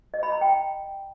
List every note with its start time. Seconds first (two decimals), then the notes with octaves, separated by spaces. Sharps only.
0.14 D#5
0.23 B5
0.32 A#5
0.41 G5